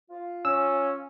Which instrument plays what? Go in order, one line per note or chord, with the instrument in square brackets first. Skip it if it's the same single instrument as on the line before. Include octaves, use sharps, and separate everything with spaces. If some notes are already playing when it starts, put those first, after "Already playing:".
[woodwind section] F4
[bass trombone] C#4 [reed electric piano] E6